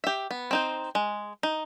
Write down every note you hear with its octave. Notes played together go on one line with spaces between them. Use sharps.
G4 E5
B3
C4 D#4 C5
G#3
D#4